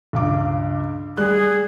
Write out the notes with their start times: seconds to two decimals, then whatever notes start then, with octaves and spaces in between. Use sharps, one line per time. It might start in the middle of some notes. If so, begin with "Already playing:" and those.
0.13 C#2 G2 D6
1.17 G3 G#4 F#6